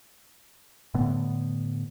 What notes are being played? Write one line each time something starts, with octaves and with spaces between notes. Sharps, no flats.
A2 D3 B3